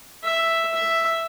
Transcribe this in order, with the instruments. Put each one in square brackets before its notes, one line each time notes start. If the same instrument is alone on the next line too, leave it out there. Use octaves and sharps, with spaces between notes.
[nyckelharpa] E5
E5